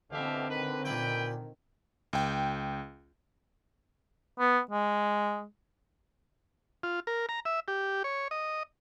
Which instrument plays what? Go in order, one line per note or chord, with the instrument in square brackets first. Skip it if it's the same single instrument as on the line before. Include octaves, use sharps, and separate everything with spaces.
[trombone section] B2 E3 A3 [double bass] D3 C4 [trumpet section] G4 E5 F5
[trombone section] D#3 [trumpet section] B4
[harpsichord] A#2 E4 [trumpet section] B4 G5
[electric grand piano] C#2 G5
[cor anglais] B3
G#3
[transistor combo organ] F4
A#4
A#5
E5
G4
C#5
D#5